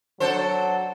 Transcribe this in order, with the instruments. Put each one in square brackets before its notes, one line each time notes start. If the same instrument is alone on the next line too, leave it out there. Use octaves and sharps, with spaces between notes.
[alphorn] F#3 [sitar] D4 A4 C5